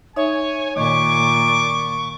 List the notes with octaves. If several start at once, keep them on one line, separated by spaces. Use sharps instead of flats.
D#4 C#5 E5 G#5
A#2 D#3 C#6 D6